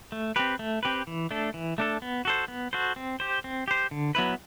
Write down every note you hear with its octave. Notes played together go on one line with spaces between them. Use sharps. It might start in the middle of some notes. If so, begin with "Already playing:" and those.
A3
C4 G4 B4
A3
C4 G4 B4
E3
A3 D4 A4
E3
A3 D4 A4
B3
F#4 A4 C5
B3
F#4 A4 C5
C4
G4 C5
C4
G4 C5
D3
F#3 B3 E4 B4